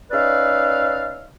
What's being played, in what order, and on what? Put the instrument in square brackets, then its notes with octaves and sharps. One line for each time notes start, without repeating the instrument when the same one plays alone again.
[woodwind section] C#4 D#4 B4 D5 E5 F5